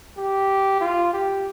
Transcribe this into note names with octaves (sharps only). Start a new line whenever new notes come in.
G4
F4
G4